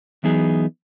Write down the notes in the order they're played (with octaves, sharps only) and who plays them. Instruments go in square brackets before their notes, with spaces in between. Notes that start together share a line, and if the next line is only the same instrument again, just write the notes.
[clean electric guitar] E3 F#3 B3 D#4 G#4